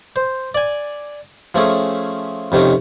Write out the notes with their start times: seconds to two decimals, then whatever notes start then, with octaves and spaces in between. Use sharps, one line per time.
0.16 C5
0.55 D5 G#5
1.55 F3 A3 C#4 G#4
2.52 F2 C3 D#3 C#4